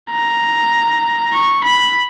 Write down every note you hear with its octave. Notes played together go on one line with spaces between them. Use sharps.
A#5
C#6
B5